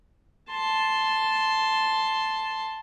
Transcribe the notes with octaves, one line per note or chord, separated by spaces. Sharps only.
A5 C6